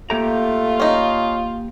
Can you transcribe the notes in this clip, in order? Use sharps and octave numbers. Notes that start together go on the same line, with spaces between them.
A3 A#3 F4 G4 A#5
C#4 D#4